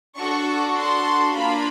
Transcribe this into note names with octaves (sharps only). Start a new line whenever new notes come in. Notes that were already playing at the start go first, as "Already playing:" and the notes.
D4 F#4 A4 C#6
C6
A#3 D4 F4 B5